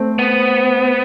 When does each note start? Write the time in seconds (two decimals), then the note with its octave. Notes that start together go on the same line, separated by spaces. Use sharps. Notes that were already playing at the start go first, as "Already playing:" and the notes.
Already playing: A3 C4
0.19 B3